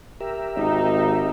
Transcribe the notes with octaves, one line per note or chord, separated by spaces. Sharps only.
G4 A#4 E5
G#1 D#4